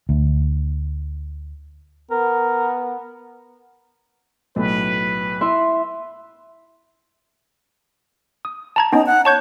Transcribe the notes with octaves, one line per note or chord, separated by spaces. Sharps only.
D2
B3 A#4
B1 A2 B4
E4 E5 C6
D#6
A5 A#5 G#6
B3 C#4 D#4
F#5
C#5 A5 C#6 G6